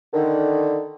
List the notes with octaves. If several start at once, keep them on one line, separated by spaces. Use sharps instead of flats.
D3 D#3